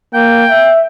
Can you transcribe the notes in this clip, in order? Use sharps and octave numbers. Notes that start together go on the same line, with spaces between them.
A#3 G5
E5